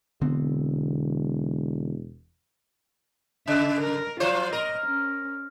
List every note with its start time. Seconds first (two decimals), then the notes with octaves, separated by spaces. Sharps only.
0.22 E1 D3 B3 C4
3.48 C#3 E5
3.81 A#4
4.20 F3 F4 C5
4.53 A#4 D#5
4.87 C#4